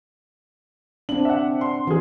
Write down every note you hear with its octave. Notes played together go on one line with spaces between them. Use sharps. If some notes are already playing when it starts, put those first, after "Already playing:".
C4 D4 F#7
E5 F#5
C6
E3 F#3 G#4